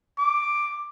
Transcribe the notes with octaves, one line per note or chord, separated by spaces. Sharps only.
D6